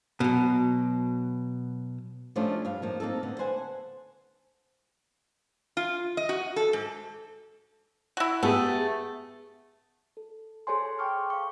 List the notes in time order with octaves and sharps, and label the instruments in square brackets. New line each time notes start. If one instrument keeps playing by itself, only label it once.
[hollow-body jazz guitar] B2 F#3
[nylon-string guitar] F3 G3 A3 C#4 D4 F4
G2 F5
F3 A#3 D#4
A#3 C4 D#4 A4
D3 B3
B4 C5 F#5 G#5
[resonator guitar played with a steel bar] F4
D#5
F#4
A4
G#2
[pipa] E4 F#4
[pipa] A3 [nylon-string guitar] B3 G4 G#4
[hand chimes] A4
G#4 A4 C5 C#5 G#5 C6
G5 A5 C#6 D6 F6
F5 C#6